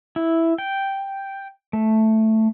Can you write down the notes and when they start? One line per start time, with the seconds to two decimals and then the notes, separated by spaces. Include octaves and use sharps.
0.16 E4
0.58 G5
1.73 A3